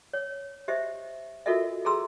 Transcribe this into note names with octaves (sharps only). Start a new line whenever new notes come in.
C#5
G4 C5 D#5 E5
F4 F#4 A4 A#4 D#5 E5
G#4 A4 A#5 C6 E6